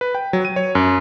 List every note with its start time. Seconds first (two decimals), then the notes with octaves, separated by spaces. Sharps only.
0.01 B4
0.15 G5
0.33 F#3
0.45 D#7
0.56 C#5
0.75 F#2